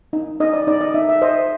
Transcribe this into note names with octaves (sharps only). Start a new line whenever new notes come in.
D#4
D#4 D#5
D5
D#4 D5
D#5
D#4 E5
E5
C5 D#5